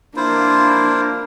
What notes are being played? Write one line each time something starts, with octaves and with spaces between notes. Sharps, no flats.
A#3 D4 E4 F4 C5